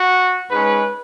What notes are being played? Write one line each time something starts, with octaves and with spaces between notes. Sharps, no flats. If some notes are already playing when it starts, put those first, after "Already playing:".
Already playing: F#4
G#2 G#3 C#4 B4